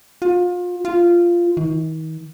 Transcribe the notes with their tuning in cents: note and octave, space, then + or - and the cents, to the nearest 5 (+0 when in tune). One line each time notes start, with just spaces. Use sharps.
F4 +30
F4 -10
D#3 +40